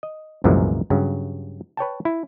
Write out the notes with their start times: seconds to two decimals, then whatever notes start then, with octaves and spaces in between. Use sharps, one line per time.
0.03 D#5
0.44 C2 F#2 A#2 E3 F3 G#3
0.90 G2 C#3 F#3
1.77 B4 C#5 G5 A5
2.05 E4